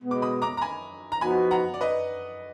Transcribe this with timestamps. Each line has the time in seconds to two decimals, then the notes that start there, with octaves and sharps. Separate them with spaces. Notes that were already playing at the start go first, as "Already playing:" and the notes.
0.03 B2 G#3 B3
0.11 D6
0.22 B5 D#6
0.42 A#5 D6
0.57 A#5
0.61 G#5 B5
1.12 A#5
1.21 F3 B3 D#4 F#4 G#5 B5
1.51 F#5 A#5
1.74 D5
1.81 B4 D#5